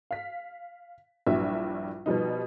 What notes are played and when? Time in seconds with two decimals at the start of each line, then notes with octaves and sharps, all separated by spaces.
0.11 F5 B6
1.27 A#1 G2 F#3 E4 E5
2.06 B2 F3 G3 D#4